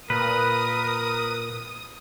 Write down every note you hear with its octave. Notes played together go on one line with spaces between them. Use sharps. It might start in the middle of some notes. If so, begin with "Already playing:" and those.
A#2 A#4 B4 D#6